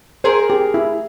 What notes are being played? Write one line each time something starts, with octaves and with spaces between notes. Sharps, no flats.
G#4 A#4 C5
G4
E4